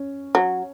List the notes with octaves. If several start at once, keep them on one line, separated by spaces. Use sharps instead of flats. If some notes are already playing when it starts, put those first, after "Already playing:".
Already playing: C#4
F#3